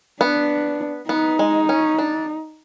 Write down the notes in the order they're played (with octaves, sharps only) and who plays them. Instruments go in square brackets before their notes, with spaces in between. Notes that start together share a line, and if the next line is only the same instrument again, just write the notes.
[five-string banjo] B3 [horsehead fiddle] D4
[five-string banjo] B3 [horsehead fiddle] D#4
[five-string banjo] G#3
C#4
D4